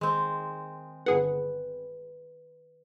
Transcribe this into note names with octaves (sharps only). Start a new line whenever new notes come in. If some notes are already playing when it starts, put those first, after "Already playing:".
D#3 G#3 C4
G1 G#4 B4 F#5